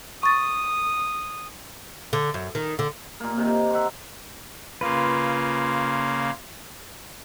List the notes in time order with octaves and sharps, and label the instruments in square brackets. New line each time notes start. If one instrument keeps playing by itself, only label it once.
[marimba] C#6 A6 [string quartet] D#6
[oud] D3
F#2
D#3
D3
[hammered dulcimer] A#2 A#3
C3 D#3
E5 F#5 A#5 C6
[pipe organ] C#3 A#3 [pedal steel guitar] F4 B4